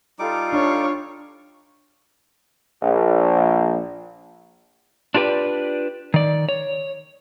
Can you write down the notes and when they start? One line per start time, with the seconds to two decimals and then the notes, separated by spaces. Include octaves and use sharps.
0.19 G3 D#4 F4 A4 D6
0.52 D4 C#5
2.82 A#1
5.14 D4 F4 G4 B4 D5
6.14 D#3 D5
6.49 C#5